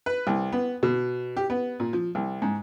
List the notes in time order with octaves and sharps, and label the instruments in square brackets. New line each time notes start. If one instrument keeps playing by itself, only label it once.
[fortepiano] B4
C2
B3
B2
G4
B3
A#2
F3
C2
G#2